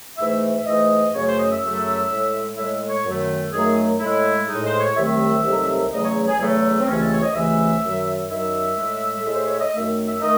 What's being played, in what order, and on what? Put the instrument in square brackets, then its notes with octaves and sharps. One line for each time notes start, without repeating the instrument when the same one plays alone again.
[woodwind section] G#2 E3 A3 E5
G#2 E3 A3 D#5
F#2 C#3 F#3 A3 C#5
C5
D#5
E5
F#2 C#3 F#3 A3
A2 G#3
A2 G#3 E5
C#5
F#2 D#3 F#3 A3
F#2 D#3 F#3 A3 G#4
A2 G#3 E4
A2 G#3 D#4
C5
C#5
C2 C3 D#3 F#3 A3 E5
C2 C3 D#3 F#3 A3
E2 C#3 F#3 A3 D#5
C#5
G#4
E2 C#3 F#3 A3
C4
C#2 C3 E3 A3 C#4
A4
C#5
D#5
C#2 C3 E3 A3 E5
F#2 D#3 F#3
F#2 D#3 F#3 E5
A2 G#3
A4
A2 G#3
C5
C#5
D#5
F#2 D#3 A3 E5
E5
D#3 A3 D#5